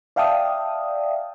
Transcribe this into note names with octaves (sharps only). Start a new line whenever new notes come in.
D5 E5 F5 G5 A5 D#6